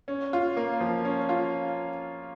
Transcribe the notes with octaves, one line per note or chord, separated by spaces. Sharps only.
C#4
F4
A#3
F3
C#4
F4